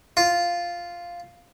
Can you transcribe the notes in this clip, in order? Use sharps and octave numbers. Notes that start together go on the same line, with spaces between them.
F4